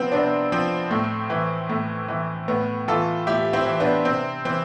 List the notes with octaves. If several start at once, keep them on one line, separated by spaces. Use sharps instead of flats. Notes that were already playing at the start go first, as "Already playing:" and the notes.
Already playing: C3 F3 B3 C4
C3 B3 D4
F3 C4
A2
E3
A2
E3
A2 B3
E3 F4 A4
A2 E4 G4
C4 E4
E3
B3 D4
C3 C4
E3 C4